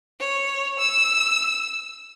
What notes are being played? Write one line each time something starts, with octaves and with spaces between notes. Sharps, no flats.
C#5
E6